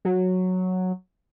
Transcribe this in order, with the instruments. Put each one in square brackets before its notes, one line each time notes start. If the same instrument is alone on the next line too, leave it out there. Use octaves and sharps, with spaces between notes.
[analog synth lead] F#3